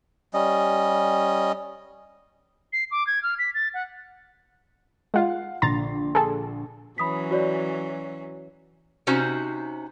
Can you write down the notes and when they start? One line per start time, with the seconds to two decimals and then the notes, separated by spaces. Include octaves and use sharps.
0.34 G3 C#4 D#5
2.73 C7
2.91 D6
3.07 G#6
3.23 F6
3.39 B6
3.54 A6
3.74 F#5
5.14 G#3 F4 F5 F#5
5.62 A#1 D3 A#5 C6 A6
6.15 G#4 A4
6.98 E3 F#3 C#4 B5 D#6 B6
7.31 F#4 C#5 D5
9.07 C3 C#4 D#4 F#4 C5